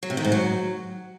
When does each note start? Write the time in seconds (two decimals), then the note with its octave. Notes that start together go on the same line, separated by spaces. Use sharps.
0.03 F#3
0.10 C3
0.17 D#3
0.25 G#2
0.32 F#3